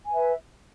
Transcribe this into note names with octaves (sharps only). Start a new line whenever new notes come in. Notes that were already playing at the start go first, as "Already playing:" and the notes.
B4 E5 G#5